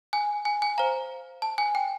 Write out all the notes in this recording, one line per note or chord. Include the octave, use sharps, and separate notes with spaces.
G#5
G#5
G#5
C5 F5 A#5
A5
G#5
G5